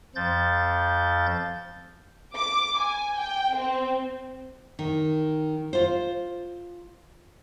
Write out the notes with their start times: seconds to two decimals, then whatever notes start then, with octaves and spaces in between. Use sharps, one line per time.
0.15 F2 F3 G6 A6
2.37 D6
2.79 G#5
3.20 G5
3.57 C4
4.79 D#3
5.73 F4 C5